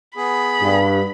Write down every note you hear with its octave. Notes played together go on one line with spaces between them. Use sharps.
B3 G#4 B5
G2